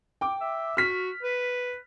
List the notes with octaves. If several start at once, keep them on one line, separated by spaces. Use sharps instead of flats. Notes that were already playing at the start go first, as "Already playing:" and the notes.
G5 D6
E5
F#4 F6 B6
B4